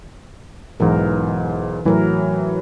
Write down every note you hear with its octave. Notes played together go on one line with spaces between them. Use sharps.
B1 G#2 E3 A#4
A2 E3 F#3 A#4